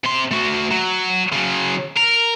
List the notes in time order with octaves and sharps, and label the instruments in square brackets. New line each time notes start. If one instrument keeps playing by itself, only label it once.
[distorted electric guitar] C3 C6
A3 F#4
F#3
C#3 F#3
A#4